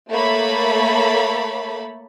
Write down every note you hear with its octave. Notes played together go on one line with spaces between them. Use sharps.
A3 A#3 C#5 E5 A5 B5